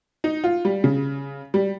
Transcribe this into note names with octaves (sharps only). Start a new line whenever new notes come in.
D#4
F4
G3
C#3
G3